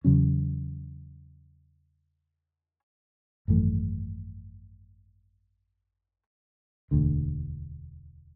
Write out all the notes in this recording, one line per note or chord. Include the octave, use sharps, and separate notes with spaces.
E2 C#3 F#3 C#4
G#1 F#2 E3 A3
E1 D2 D3